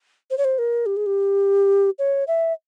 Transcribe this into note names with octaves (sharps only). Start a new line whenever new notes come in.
C5
C#5
C5
A#4
G4
G#4
G4
C#5
E5